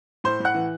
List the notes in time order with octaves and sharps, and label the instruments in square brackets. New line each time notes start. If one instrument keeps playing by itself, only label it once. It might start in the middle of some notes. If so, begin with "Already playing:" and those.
[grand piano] A2 C5 C6
A2 F#5 F#6
E3